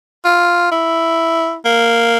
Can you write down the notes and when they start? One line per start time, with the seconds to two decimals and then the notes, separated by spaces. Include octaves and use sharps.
0.25 F4
0.71 E4
1.65 A#3